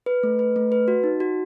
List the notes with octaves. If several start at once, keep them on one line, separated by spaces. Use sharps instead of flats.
B4
A3
B4
A3
B4
F#4
D#4
F#4